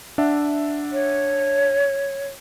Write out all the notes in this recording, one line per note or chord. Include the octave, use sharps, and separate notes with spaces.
D4 E5 F#5
C#5